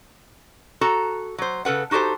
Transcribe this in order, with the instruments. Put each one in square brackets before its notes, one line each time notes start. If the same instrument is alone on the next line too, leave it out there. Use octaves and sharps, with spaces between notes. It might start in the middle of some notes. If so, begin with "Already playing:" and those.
[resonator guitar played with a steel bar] F#4 A4 A#5
F#3 C5
C#3 A4 B4 F#5
D#4 F#4 G4 A4 C5